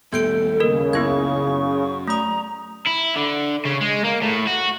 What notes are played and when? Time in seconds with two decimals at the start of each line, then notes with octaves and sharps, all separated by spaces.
0.13 D#2 A2 G3 B3 A4 G6 D7
0.60 C#3 A#3 A#4
0.93 C#2 F#2 B3 E4 C#6 G#6
1.47 F#2
2.07 A3 A#5 D#6
2.87 E4
3.16 D3
3.65 C#3
3.81 G#3
4.04 A#3
4.22 A2
4.47 F#4